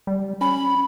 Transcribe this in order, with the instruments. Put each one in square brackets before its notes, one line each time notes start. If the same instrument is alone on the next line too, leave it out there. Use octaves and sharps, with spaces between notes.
[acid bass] G3
[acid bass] C#4 [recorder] B5